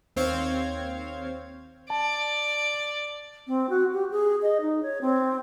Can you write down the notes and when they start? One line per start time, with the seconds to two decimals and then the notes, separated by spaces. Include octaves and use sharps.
0.16 D#2 C4 C5 C#5 F5 G#6
1.90 D5 A5
3.47 C4
3.70 F#4
3.93 G4
4.11 G#4
4.42 D#5
4.61 D#4
4.83 C#5
5.01 C4